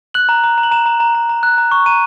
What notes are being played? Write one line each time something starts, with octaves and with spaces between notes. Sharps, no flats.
F#6 F#7
A#5
A#5
A#5
F#7
A#5 E7
A#5
A#5
A#5
A#5
F#6
A#5
C#6
A#5 D#7